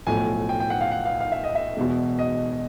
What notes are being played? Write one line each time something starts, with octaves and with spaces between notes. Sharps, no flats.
B1 A2 F3 A3 G#5
G5
G5
F#5
F5
F#5
F5
F5
E5
D#5
E5
E1 E2 B2
D#5